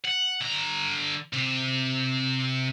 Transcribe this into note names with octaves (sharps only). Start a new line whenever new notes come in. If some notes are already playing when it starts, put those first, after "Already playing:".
F#5
D3 A#5
C3